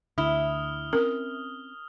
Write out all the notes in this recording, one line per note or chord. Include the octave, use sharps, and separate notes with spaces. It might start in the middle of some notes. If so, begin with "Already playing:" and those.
D2 D3 E4 D#6 F6 G7
C4 C#4 A#4